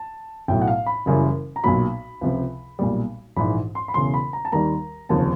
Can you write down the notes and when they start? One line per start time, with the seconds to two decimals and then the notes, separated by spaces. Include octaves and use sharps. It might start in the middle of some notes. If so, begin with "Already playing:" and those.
Already playing: A5
0.48 B1 A2 F#3 G5
0.62 F#5
0.68 F5
0.86 B5
1.06 F#1 F#2 C#3 E3 G3
1.56 A#5
1.64 B1 A#2 F#3 B5
2.21 C#2 C3 F3
2.79 B1 A#2 G3
3.37 A#1 G#2 E3 B5
3.75 C6
3.88 B5
3.94 E1 E2 C#3 C6
4.14 B5
4.33 A#5
4.45 A5
4.52 D#2 D#3 G3 A#5
5.09 F1 D#2 C#3 F3 A5